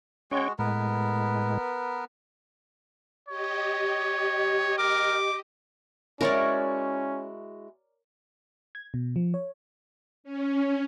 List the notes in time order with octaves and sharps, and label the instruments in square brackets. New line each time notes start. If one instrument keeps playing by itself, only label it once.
[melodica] G#3 F#4 [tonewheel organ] C#4 C#5 G5
[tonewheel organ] A2 G#3 [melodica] B3 A#4 B4
[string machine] G4 D#5 [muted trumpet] C#5
[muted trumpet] A#4 [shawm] D6
[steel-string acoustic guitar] G#3 E4 F#4 [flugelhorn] C#4 [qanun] A#4 C#5 D5
[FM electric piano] G#6
B2
F3
C#5
[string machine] C#4